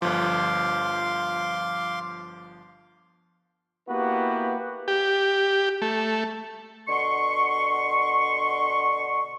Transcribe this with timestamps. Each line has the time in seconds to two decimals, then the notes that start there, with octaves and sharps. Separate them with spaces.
0.02 G1 F3 F5 C6 D6
3.89 A#3 B3 E4 F#4 G4 B4
4.88 G4
5.82 A3
6.88 B2 D3 C6 C#6